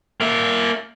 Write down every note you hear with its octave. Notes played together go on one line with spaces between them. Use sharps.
A#3 E5